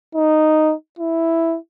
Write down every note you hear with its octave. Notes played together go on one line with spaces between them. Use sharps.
D#4
E4